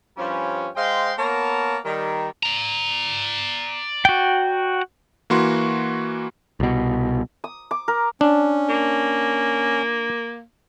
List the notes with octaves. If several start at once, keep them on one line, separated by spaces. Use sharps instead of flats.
G2 F3 G3 C#4
G#3 C5 D#5 F5 G5 C6
A#3 B3 A#4 C#5 A5
D#3 G3
D5 A#5
F#4 G5
E3 A#3 F#4 C6
C2 B2
D#6
D6
A#4
C#4 D4
A#3